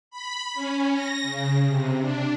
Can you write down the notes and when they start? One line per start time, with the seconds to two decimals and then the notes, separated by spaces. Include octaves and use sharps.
0.11 B5
0.54 C#4
0.94 A#6
1.23 C#3
1.67 C3
2.00 D4